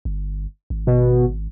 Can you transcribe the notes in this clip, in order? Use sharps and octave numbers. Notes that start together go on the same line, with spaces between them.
G1
G#1
B2